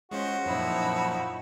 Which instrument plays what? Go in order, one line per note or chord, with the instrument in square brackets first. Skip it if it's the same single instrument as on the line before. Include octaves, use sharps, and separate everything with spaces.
[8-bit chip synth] G#3 F4 C5 [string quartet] C#4 [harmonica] F#4
[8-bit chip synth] F#2 A#2 [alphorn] F3 [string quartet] D#4 E4